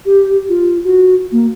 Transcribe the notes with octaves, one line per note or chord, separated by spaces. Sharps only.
G4
F4
F#4
A#3